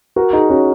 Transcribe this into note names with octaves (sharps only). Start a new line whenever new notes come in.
F#4 A#4
D#4 G#4
C#4 F#4